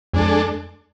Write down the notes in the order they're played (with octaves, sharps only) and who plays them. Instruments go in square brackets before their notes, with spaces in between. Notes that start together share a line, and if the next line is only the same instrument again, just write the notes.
[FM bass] F2 [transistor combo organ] G#3 D4 A4